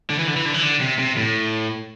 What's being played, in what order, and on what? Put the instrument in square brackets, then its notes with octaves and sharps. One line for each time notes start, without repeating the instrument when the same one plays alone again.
[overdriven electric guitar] D3
E3
D3
E3
D3
E3
D3
C3
C3
A2